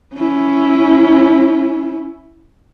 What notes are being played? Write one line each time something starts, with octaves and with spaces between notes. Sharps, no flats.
C#4 E4